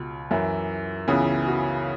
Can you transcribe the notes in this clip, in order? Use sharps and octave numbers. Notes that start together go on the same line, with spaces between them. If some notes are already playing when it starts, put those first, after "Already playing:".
Already playing: C#2 B2
F#2 E3 E4
C#2 C#3 E3 B3
F#4